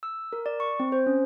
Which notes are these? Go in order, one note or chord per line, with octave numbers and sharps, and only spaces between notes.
E6
A#4
D5
C#6
C4
C5
C#4